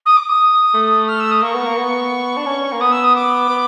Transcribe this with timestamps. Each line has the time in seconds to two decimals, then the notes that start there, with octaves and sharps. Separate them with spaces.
0.05 D#6
0.16 D6
0.29 D#6
0.74 A3
1.08 F6
1.20 E6
1.31 D#6
1.43 A#3 C#6
1.54 B3
1.66 A#3
1.77 B3
2.37 D4
2.46 C#4
2.73 A#3
2.80 B3 D#6
2.91 E6
3.03 D#6
3.15 D6
3.49 B3